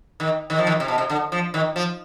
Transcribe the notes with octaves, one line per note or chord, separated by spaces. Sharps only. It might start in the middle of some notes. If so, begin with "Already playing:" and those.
D#3
D#3
F3
D#3
C3
B2
C3
D3
F3
D#3
F3